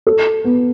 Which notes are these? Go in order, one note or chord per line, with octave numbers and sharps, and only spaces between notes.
A4
B3